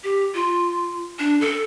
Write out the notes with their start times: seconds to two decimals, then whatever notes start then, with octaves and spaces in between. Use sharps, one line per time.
0.04 G4
0.35 F4
1.19 D4
1.41 A4